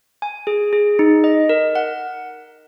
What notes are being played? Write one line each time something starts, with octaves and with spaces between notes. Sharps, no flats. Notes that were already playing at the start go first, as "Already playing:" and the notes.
G#5
G#4
G#4
D#4
D#5
A#4
F#5